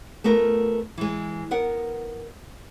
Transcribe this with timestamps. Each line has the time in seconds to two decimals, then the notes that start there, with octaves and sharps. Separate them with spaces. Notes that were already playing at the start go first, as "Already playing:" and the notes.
0.24 A3 B3 F4 A#4
0.98 E3 G#3
1.51 B3 A#4 F#5